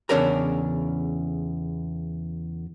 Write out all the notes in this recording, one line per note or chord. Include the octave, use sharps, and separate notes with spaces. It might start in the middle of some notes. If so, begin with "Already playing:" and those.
E2 C#3 C#4 D4 A#4 A#5